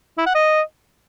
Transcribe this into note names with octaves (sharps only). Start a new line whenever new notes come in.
E4
F#5
D#5